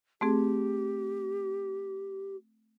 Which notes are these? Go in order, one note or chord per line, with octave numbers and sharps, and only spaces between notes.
A3 C4 G4 G#4